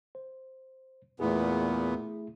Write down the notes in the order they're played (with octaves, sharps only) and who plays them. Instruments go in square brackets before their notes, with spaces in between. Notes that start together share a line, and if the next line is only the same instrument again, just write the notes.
[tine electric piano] C5
[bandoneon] E2 A#2 B3 [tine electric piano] A3 E4 G#4